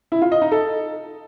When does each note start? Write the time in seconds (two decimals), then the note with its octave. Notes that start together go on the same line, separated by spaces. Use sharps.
0.12 E4
0.22 F4
0.32 D#5
0.42 D#4
0.52 A4